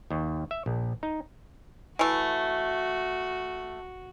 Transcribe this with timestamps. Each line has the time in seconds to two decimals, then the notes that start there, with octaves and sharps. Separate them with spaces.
0.10 D#2
0.51 E5
0.66 A#1
1.03 D#4
1.99 E3 A3 F#4